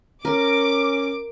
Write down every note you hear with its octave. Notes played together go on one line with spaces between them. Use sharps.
C#4 A#4 D6